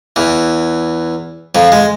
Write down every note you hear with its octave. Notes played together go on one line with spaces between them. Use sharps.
E2 E3
F2 F3
G#3